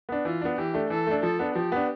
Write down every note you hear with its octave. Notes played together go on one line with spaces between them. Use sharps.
B3 D4
E3 F4
B3 D4
E3 G4
A3 D4
E3 A4
A3 D4
F3 A4
B3 D4
F3 G4
B3 D4